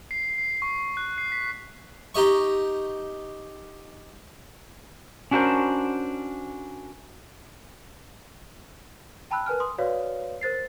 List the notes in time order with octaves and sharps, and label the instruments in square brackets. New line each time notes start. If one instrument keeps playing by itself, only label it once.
[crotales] C7
C7
C#6
F#6
C7
B6
[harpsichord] D#4 G4 D#5 C#6
[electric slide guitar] C#4 D4 F#4 G4 A#4 C5
[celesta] G5 A5 B5 E6 F#6
A#4 B4 G#5 F6
C6 D#6
F#4 B4 C#5 D5 F5
A#4 C5 A6 C7